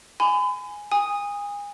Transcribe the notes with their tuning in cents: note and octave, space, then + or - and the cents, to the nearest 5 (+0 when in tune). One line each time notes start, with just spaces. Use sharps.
G#5 +0 B5 +40
G#5 -30 D#6 +0